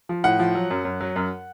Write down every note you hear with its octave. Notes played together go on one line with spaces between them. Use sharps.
F3
A2 F#5
F3
F#3
F#2
F#2
F#3
F#2